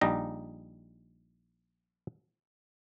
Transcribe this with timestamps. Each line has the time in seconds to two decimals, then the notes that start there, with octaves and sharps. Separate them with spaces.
0.01 A#1 G3 D#4 A#5